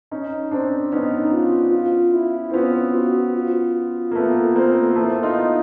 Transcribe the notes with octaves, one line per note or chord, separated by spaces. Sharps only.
C#4 D#4
C4 D4
B3 C#4 D#4
F4
F4
E4
C4
B3 C#4 F4
F#4
F4
A#3
A3 B3
A#3 C4
A3 B3 E4
D#4 F4